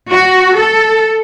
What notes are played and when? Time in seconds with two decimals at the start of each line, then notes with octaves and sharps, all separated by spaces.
0.11 F#4
0.57 A4